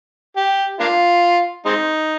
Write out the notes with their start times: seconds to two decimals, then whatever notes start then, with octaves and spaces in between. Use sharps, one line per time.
0.36 G4
0.80 A#3 D4 F4
1.66 G#3 C4 D#4